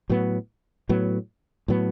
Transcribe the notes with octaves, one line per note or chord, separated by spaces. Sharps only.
A2 F#3 B3
A2 F#3 B3
A2 F#3 B3